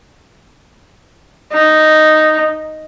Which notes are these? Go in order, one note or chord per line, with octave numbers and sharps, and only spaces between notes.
D#4